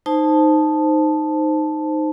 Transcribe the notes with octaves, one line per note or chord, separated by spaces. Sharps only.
D#4 C5 A5